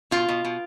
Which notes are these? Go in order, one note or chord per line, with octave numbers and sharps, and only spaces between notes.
B2 F4
B2
B2